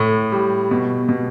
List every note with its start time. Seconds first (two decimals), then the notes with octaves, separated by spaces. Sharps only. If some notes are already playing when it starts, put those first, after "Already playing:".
Already playing: A2
0.32 G3
0.71 B2
1.09 B2